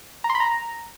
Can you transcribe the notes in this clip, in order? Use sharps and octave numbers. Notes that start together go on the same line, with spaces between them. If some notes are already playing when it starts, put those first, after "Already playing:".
A#5
C6
B5
A#5